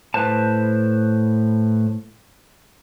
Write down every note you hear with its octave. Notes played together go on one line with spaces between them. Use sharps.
A2 B4 C5 A5